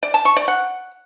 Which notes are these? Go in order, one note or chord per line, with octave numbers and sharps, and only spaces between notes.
D5
A5
C#6
D5
F#5